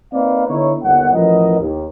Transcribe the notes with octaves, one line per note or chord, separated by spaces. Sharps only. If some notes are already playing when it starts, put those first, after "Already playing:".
A#3 C4 D#4 B4 D5 F5
D3 B3 D#4 E4 C#5
G1 D#2 F#5
A1 F3 B3 A#4 D#5
D#2